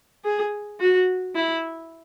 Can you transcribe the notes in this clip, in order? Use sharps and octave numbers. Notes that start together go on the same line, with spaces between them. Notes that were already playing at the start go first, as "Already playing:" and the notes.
G#4
F#4
E4